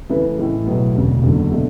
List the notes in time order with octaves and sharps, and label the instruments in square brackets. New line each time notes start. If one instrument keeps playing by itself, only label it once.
[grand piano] C#3 E3 A3 E4 B4
A2 E3 G#3
B1 A2 F#3 B3
E1 D2 C#3
F#1 E2 D3 F#3
B2 A3 D4